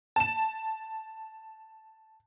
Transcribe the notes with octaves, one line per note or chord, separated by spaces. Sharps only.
A5 E7